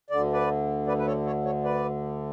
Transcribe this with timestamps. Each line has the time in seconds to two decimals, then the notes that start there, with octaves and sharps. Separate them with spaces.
0.10 D2 D3 D5
0.33 B4 D5
0.87 B4 D5
0.98 B4
1.06 A4 C#5
1.26 A4 C#5
1.45 A4 C#5
1.64 B4 D5